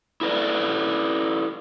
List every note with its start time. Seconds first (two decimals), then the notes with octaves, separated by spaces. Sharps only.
0.21 E4 A4 B4 D5